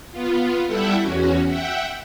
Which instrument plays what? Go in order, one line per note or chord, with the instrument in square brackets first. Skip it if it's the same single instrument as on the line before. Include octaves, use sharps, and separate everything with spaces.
[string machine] B3 F4
G3 E4 G4 A4 E5 F#5
E2 C#4 F#4
E5 F#5 G5